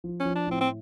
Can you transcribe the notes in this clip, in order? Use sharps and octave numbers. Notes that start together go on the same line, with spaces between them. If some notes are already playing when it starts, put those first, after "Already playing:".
F3
C#4
F3
D4
A2 C4
C4